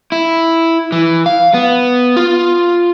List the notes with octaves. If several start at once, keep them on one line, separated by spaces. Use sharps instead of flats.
E4
E3
F5
B3
F4